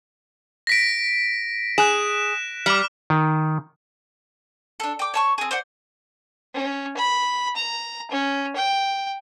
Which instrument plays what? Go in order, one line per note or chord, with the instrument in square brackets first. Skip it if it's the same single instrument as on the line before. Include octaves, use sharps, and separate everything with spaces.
[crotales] A#6 B6 D7
[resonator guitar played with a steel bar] G#4 [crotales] F#6 E7
[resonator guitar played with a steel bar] G3 [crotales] D6 F6
[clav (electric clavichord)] D#3
[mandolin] D4 A4
G5 D6
C#5 A5 C#6
C4 G#4
C5 D5 F#5
[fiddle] C#4
B5
A#5
C#4
G5